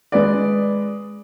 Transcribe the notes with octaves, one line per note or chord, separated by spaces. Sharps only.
G#3 B4 D5